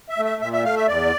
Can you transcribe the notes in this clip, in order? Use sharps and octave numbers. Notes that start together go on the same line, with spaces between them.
E5
A3
E5
A#2 E5
E5
A3 F5
E5
E2 D5